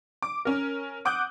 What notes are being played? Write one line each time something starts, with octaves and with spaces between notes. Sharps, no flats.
D6
C#4 A#4
F#5 D6 D#6 F#6 G6